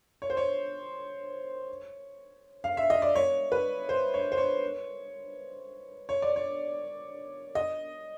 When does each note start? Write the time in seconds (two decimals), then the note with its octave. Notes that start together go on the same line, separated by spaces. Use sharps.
0.22 C#5
0.30 C5
0.37 C#5
2.64 F5
2.77 E5
2.90 D#5
3.02 D5
3.15 C#5
3.52 B4
3.89 C5
4.14 C#5
4.32 C5
4.38 C#5
6.09 C#5
6.22 D5
6.36 C#5
7.55 D#5